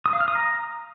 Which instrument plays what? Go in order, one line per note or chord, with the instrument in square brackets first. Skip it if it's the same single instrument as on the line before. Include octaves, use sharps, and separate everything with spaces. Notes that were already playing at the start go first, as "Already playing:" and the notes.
[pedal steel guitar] D#6
F5
F6
D#6
A#5